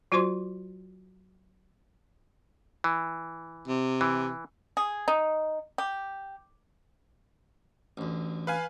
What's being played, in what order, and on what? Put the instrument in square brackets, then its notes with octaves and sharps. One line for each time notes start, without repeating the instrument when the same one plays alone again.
[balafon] F#3 F4 F#4 C5 C6
[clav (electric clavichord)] E3
[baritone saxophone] C3
[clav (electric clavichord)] E3
[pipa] G#4
D#4
G4
[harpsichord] A1 D2
[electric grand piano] B4 F5 G#5